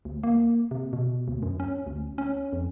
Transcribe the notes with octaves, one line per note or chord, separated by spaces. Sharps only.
D2
A#3
C3
B2
D2
F#2
C#4
D2
C#4
F2